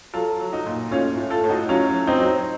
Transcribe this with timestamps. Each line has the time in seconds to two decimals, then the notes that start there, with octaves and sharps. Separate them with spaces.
0.13 F#3 F4 A4
0.40 F#3
0.52 D#4 F#4
0.66 A#2
0.91 A2 C#4 F4
1.17 A2
1.30 F4 A4
1.44 A2
1.49 D#4 F#4
1.69 F#3 C#4 F4
1.94 F#3
2.07 C4 D#4
2.20 F#3